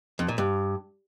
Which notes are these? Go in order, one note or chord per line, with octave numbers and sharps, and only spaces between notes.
F2
A#2
G2